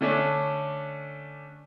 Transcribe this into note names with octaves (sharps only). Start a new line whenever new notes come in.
D3 A3 C#4 D4